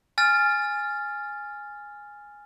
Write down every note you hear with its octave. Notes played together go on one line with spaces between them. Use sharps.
G#5 F6 A6